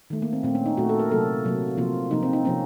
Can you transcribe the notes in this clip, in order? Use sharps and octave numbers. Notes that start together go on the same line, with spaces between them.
D#3 A3
A#3
C4
A#2 A3 C4
C#4
D#4
A#2 A3 F#4
A4
A#4
C3 F#3 A#3 A4
C3 F#3 A#3
C3 F3 A#3 F4
C3 F3 A#3 D#4
C4
D#4
C3 F3 A#3 C#4